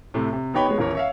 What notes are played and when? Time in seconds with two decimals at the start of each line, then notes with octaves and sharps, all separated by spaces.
0.14 A2 C3
0.33 C3
0.54 B3 D#4 G4 C#5 G5 B5
0.66 G#3 B3 C#5
0.78 D#1 A1 E3 A#4 C#5
0.95 C#5 E5 F5